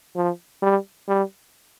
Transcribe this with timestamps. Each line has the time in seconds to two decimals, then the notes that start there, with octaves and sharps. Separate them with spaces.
0.16 F3
0.62 G3
1.08 G3